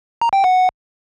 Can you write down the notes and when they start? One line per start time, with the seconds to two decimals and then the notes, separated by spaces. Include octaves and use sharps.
0.22 A#5
0.33 G5
0.44 F#5